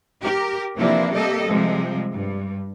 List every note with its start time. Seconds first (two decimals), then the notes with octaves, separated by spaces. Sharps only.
0.22 G4 A#4
0.77 C3 E3 F3 A#3 D4 E4
1.15 G3 A#3 G4 A4 D#5
1.48 C3 F3 G3 G#3
2.12 G2